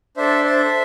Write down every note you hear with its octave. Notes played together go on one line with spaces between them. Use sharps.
D4 A4 C5 E5
C5 E5